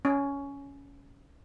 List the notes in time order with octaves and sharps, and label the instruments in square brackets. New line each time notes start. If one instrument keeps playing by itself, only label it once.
[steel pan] C#4